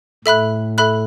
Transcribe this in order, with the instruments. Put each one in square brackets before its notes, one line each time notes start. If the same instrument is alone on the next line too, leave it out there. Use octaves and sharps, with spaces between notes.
[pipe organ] A2 [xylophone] A4 E5 B5 F#6
[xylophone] A4 E5 B5 F#6